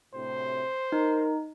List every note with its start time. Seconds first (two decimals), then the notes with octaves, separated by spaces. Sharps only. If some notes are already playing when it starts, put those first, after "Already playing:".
0.14 D2 A2 C3 C5
0.92 D#4 A#4